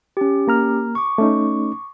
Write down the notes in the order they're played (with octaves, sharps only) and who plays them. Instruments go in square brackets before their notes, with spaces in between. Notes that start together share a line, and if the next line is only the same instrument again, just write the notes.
[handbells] C#4 G4
[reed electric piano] A#3 A#5 F6
[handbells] C#6 D6
[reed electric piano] A3 C#4 D#4